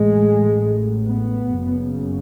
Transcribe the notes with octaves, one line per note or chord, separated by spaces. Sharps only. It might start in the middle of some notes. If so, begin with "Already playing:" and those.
Already playing: A1 A2 G#3
B3
F#1 F#2 C#3